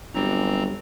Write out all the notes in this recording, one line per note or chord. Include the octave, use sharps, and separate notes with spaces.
G1 F#2 G3 C4 A#5